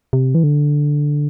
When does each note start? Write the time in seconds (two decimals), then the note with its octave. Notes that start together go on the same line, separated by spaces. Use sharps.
0.13 C3
0.35 E3
0.44 D3